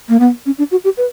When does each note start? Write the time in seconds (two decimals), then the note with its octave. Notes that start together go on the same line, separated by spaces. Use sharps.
0.09 A#3
0.20 B3
0.46 C#4
0.58 D4
0.71 F#4
0.84 G4
0.97 B4